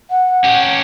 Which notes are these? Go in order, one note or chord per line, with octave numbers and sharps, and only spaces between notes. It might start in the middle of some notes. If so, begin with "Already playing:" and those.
F#5
C#4 G4